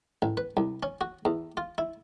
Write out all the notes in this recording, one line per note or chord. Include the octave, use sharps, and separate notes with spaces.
A1
B4
C2
C#4
F#4
E2
F4
E4